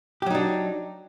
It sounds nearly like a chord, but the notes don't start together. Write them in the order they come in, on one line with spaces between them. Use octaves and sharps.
G4 F#3 D#4 D4